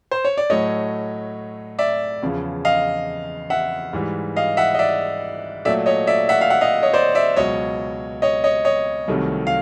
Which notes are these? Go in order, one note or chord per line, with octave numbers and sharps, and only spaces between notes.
C5
C#5
D5
A2 F#3 A3 C#5 D#5
D5 E5
E2 C#3 F3
D#5 F5
E5 F#5
G#2 E3 G3
D#5 F5
E5 F#5
D#5
D5 E5
A#2 F#3 A3 D5 E5
C#5 D#5
D5 E5
E5 F#5
F5
E5 F#5
D#5 F5
C#5 D#5
C5 D5
D5 E5
C#2 B2 F#3 C#5 D#5
C#5 D#5
C#5 D#5
C#5 D#5
C2 C3 D#3 F#3 A3
F5